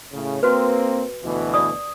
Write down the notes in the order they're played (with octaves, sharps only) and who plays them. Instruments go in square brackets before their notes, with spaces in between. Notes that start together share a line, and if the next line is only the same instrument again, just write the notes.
[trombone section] A2 C#3
[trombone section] A#3 C4 [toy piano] F#4 B4
[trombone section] D2 B2 E3
[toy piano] D5 D#6